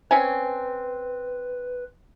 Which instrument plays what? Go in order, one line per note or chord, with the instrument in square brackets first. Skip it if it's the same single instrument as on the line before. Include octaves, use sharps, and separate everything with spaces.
[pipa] C4 C#4 G#5 [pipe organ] B4